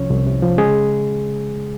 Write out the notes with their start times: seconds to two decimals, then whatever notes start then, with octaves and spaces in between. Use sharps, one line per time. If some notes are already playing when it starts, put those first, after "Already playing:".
Already playing: C2 C3 F3 C#4 C#5
0.10 C2
0.27 C3
0.42 F3
0.58 C#3 G#3 G#4